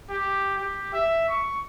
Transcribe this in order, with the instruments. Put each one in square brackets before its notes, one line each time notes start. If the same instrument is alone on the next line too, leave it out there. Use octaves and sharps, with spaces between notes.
[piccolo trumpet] G4
G4
E5
C#6